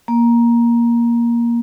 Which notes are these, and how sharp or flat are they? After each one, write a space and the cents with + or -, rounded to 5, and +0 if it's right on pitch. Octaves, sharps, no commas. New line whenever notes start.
A#3 +15